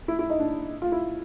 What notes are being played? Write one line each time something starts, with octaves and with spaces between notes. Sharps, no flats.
E4
E4
D#4
D4
F4
E4